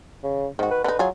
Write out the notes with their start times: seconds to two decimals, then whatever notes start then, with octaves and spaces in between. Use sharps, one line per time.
0.24 C#3
0.59 G#2 D#3 F#4
0.71 B4
0.84 D3 D#4 B4
0.99 F#3 F4 G#4